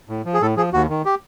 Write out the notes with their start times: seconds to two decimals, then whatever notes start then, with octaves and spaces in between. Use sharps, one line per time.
0.09 A2
0.26 F3
0.34 G#4
0.42 A2 A4
0.57 F3 G#4
0.73 D#2 F#4
0.89 D#3
1.05 G4